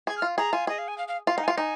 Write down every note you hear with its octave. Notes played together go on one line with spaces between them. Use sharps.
G#4 G#6
F6
F4
G#4 A#5
F4 G#5
G#4 D#5
F5
G#5
F5
F5
F4 F5
D#4
G#5
F4 F5
D#4 G#5